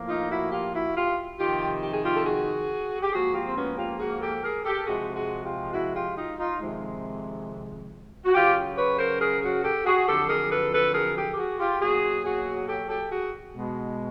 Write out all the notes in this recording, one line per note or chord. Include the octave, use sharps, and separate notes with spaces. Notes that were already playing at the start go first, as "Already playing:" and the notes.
Already playing: A2 F3 A#3
D#4 F4
E4 F#4
F4 G4
E4 F#4
F4 G4
F2 C3 D#3 F4 G4
G4
G#4
F4 G4
A4
F#4 G#4
G4
G#2 F3 A#3 F#4 G#4
F4 G4
C4
B3 C#4
F4 G4
F#4 G#4
G4 A4
G#4 A#4
G4 A4
F2 C3 F3 G#3 F#4 G#4
F#4 G#4
F4 G4
E4 F#4
F4 G4
D#4 F4
D#4 F4
F2 C3 D#3 G#3
F#4
F#2 C#3 F#3 F4 G4
B4 C#5
A#4 C5
G#4 A#4
F#4 G#4
G4 A4
F#4 G#4
F2 D3 F#3 G4 A4
G#4 A#4
A4 B4
A4 B4
G#4 A#4
G4 A4
G4
F#4 G#4
F4 G4
B2 F#3 A#3 F#4 G#4
F#4 G#4
G4 A4
G4 A4
F#4 G#4
B2 G#3